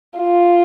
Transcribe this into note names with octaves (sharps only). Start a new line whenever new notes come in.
F4